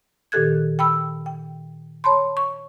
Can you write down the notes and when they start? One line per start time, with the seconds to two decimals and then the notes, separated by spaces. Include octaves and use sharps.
0.32 A#2 D#3 G4 A4 F#6 G#6
0.79 G5 B5 E6
1.26 G5
2.04 C#5 A5 B5 C6
2.37 C#6